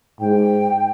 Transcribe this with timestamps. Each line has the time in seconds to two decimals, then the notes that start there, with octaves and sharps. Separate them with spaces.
0.20 G#2 G5